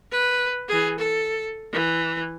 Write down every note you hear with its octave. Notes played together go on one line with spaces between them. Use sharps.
B4
E3 G#4
A4
E3